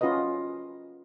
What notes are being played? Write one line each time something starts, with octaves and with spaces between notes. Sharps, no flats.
C#4 F4 F#4 B4 D#5